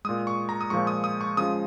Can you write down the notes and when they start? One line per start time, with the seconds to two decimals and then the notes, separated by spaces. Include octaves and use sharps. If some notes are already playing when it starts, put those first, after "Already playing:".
0.05 A#2 G#3 D#6
0.27 C#6
0.49 A#5
0.61 D#6
0.70 A#2 F3 G#3 C#6
0.87 D#6
1.04 D#6
1.21 C#6
1.37 C#3 F3 G#3 D#6